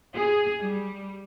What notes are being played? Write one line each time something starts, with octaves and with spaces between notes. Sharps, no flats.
G#4
G3